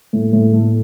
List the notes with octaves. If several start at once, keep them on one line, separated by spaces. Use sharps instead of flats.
A2
A2
A3